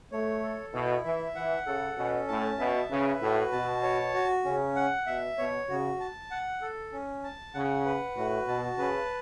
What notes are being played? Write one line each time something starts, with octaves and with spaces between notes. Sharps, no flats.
A3 C#5
A4
B2 E4
E3 E5
E3 F#5
C#3 A4
B2 C#4
A2 A5
B2 E5
C#3 B4
A2 F#4
B2 A5
C#5
F#4
C#3 C#4
F#5
B2 E5
B2 C#5
C#3 F#4
A5
F#5
A4
C#4
A5
C#3 F#5
B4
A2 F#4
B2 A5
C#3 B4